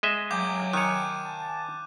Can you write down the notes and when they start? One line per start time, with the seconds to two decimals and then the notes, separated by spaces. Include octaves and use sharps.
0.03 G#3 D#5 E5
0.31 F#3 F5 G5 G#5 D6 G6
0.73 D#3 C#5 F#6 D#7
1.25 A5